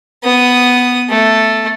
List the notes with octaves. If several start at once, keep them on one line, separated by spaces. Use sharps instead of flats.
B3 D#6
A3